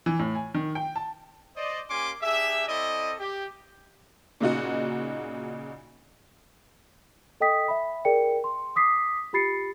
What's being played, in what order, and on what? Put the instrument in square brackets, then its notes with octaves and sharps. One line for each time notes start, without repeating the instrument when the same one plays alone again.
[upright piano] E3
A2
G#5
D#3
G5
A5
[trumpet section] C5 D5 D#5
A#3 C#4 G4 G#5 C6 D6
D4 G4 G#4 E5
C4 E4 A4 D5 D#5
G4
[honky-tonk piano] A#2 C#3 D#4 F#4
[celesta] A4 D#5 G5 D#6 B6
E5 B5
G#4 A#4 D5 G5 C#7
C6
D6 D#6 B6 C7
F4 G4 B5 A6 C7 C#7